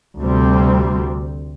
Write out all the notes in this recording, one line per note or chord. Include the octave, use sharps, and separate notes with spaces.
D2 C3 G3 C4